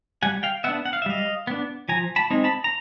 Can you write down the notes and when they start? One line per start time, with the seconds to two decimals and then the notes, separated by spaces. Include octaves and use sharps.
0.23 G3 F#5 G#5
0.43 F5 G5
0.64 B3 D4 E5 F#5
0.86 F#5
0.93 F5
1.02 E5
1.06 G3 D#5 F5
1.47 B3 D4
1.89 F3 G#5 A#5
2.16 A5 B5
2.30 G#3 C4 D#4
2.44 A5 B5
2.64 A#5